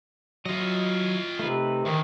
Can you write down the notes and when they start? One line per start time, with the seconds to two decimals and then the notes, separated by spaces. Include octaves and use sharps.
0.46 F#3 E4 F4 D#5
1.39 C3 A3 D#4 B4
1.85 D2 A2 D#3